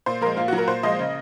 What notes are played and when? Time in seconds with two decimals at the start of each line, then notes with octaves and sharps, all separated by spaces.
0.06 A#2 C5
0.21 F3 G#3 A#4
0.37 A#2 F4
0.48 F#3 F#4
0.58 A#4
0.68 A#2 C5
0.83 F3 G#3 D#5
0.99 C#3